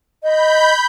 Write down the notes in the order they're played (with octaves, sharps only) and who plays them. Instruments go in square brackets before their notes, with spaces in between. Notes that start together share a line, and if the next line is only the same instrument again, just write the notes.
[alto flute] D#5 [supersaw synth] B5 G6